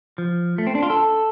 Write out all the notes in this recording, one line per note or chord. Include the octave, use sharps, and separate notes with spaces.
F3
A3
C4
D4
F4
A4